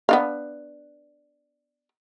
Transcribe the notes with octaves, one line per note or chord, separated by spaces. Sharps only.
B3 D4 F5